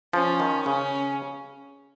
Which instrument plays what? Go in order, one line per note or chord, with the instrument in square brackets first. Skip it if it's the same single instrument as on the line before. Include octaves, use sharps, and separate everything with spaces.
[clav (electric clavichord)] F3 [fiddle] C#4
[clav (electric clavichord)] D#3
[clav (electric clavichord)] C#3 [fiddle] C#4